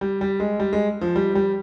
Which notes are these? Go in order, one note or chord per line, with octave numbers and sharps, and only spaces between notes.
G3
G3
G#3
G3
G#3
F3
G3
G3